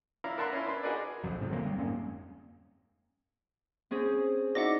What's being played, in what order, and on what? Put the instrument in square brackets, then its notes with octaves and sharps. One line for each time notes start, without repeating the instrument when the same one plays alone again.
[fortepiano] D4 E4 F5 A#5
A#4 E5 F#5 A5 A#5 C6
C#4 E4
D4 B4 C6
D#4 F#4 G#4 A#4 B4 D5
[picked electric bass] D1 B1 F2 F#3
G#2 C3
D3 F#3 G#3 A#3
G3 C4
F2 G#2 A#3 C#4
[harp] C4 C#4 G#4
[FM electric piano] D#4 F#4 D5 [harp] E4 [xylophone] F#5 D6 A#6